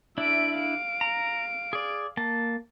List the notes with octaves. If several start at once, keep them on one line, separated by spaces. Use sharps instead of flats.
D4 E4 E5 D7
F5 D7
A#5
G#4 D5
A#3 A5